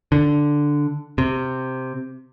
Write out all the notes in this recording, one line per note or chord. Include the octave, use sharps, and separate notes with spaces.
D3
C3